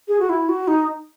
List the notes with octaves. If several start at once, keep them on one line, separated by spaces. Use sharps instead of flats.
G#4
F#4
E4
F#4
D#4